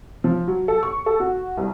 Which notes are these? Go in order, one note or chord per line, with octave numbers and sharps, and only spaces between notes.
F3
F#3
A4
C#6
A4
F#4
C2